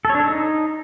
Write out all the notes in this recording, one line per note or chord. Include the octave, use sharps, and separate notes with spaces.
A4
C#5
D4
A4
D#4